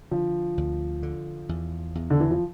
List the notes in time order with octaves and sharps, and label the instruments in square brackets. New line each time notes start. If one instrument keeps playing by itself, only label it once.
[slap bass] D3 [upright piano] F3
[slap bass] D2
D3
E2
E2
[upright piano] D3
E3
F3